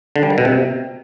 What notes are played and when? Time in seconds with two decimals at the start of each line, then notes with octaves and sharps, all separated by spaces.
0.16 D3
0.23 G3
0.30 D#3
0.38 B2
0.45 C3